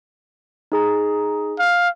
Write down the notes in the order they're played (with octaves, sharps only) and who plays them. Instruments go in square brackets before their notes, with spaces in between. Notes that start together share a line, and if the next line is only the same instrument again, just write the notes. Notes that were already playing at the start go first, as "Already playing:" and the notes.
[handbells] D#4 G#4 A#5
[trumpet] F5